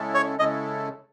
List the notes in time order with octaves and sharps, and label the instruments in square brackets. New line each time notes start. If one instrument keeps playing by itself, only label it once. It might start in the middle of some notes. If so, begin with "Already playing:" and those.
Already playing: [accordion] C#3 G#3 C#4 E4 A4
[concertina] C#5
[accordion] C#3 G#3 C#4 E4 A4 [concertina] D#5